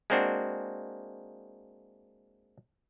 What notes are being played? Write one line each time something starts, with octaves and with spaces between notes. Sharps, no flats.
G#3 A#3 C4 D4 F#4